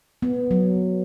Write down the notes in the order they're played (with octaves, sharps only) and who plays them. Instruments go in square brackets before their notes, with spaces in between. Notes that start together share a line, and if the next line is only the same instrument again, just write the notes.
[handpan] B3
F#3